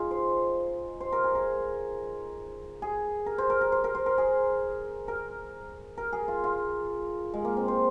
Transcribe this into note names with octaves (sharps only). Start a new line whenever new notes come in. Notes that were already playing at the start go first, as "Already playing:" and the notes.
Already playing: D#4 F4 G#4
C5
C5
A#4
G#4
A#4
G#4
A#4
C5
A#4
A#4
C5
A#4
C5
A#4
G#4
A#4
A#4
G#4
F4
F4
G#3
A#3
C4
C5